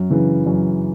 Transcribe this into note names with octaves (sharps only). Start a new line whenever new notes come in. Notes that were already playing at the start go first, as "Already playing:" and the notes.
Already playing: F#2
C#3 E3
F#2